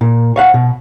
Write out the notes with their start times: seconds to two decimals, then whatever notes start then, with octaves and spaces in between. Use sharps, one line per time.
0.01 A#2
0.36 C#5 F5 F#5
0.54 B2